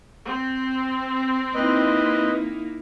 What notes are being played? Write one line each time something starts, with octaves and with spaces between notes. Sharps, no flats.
C4
A#3 D#4 E4 B4 D#5